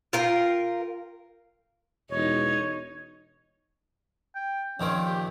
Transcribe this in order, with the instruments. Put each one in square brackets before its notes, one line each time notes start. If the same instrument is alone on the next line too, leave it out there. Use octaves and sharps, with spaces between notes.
[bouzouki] F4 A#4 G5
[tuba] E1 [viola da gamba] D#4 [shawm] C#5
[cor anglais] G5
[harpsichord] A#1 D#3 C4 [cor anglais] C#4
[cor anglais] G4